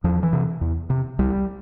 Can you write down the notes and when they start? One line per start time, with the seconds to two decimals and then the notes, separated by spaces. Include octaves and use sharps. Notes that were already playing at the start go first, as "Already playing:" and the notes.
0.04 E2 F3
0.23 E3
0.33 C3
0.61 E2
0.90 C3
1.19 C2 G3